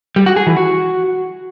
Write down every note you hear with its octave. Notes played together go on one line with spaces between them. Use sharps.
G3
F#4
G#4
E3
F#4